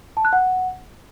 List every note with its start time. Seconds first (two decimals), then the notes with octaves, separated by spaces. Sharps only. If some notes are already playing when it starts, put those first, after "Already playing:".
0.17 A5
0.25 F#6
0.33 F#5